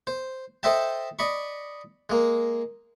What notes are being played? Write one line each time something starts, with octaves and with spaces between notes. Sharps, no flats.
C5
A4 C5 D#5 E5 G5 A5
D5 D#5 B5 C#6
G#3 A#3